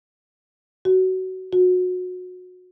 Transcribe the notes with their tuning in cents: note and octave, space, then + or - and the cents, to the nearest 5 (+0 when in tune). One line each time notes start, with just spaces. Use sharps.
F#4 +20
F#4 -25